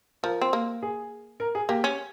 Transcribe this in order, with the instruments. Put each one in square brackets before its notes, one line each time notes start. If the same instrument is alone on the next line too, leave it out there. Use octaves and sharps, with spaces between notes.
[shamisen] F3 [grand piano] A#4
[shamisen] C4
A#3
[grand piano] G#4
A#4
G#4
[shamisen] A#3 [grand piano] G4
[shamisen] C#4